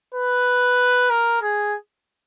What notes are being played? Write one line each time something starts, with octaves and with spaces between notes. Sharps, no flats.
B4
A#4
G#4